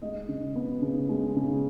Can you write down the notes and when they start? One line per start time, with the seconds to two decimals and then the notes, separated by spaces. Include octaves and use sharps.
0.02 G#3 D#5
0.28 C#3
0.56 B3
0.82 C#3
1.09 G#3
1.36 C#3